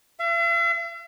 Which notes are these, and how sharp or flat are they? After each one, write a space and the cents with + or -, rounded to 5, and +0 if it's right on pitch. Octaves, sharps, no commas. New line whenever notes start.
E5 +45